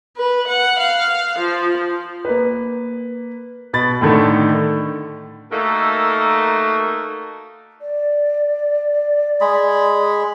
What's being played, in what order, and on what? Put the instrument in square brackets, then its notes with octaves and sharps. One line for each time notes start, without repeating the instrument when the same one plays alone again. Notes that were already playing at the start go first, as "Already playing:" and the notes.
[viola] B4
F#5
F5
F3
[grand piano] A#3 B4
B2 B5 A6
A2 D3 D#3 A3
[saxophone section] A3 A#3 D#4 F#4 A4 A#4
[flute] D5
[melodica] G#3 G#4 B5